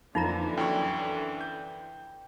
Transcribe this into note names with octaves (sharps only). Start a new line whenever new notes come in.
F2 D3 E3 F3 A#3 D#4 F4 A#5
F#2 E4 G5 C#6
G6